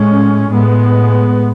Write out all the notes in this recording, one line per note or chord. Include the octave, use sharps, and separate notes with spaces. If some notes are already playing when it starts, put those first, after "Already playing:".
Already playing: A2 G#3 C#4
A2 G#3 B3